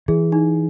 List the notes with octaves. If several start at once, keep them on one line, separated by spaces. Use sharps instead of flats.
E3 G#4
D#4